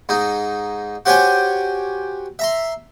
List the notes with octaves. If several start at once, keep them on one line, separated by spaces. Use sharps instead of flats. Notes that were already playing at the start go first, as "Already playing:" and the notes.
G#2 D#4
F#4 G4 C5 C#5 G5 G#5
E5 A#5 C6